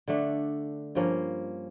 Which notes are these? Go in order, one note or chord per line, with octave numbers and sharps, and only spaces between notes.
D3 A3 D4
G2 F3 A#3 C#4